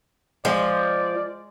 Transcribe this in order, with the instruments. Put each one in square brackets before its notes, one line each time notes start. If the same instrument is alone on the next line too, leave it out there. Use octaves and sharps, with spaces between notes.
[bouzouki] F3 [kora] G#3 [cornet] D5